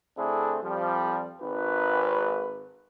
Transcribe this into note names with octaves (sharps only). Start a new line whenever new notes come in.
D3 A3 C4 D4 E4 G#4
F2 F3 G3
G#1 B4